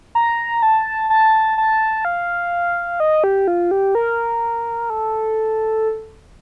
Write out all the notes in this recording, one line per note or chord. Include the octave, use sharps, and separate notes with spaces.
A#5
A5
A5
A5
F5
D#5
G4
F4
G4
A#4
A4